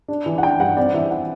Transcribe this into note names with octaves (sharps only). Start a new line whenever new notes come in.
D4
E3
F#5
D4 G5
G2 F#5
C4 D5
E3 E5
F#5